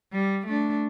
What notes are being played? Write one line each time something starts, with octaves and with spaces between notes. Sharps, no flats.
G3
A3 D4